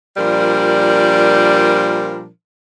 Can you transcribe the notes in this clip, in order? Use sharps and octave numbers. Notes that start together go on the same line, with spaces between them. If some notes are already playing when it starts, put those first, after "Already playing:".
A#2 F3 G3 D4 A#4